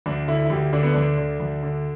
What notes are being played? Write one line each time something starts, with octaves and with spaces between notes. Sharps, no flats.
D2 D4
D3 E4
E4
D2 G4
D3 D4
B3
D2 D4
D3
D2
D3